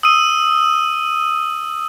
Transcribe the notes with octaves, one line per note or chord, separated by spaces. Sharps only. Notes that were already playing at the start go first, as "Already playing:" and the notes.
D#6 E6 D#7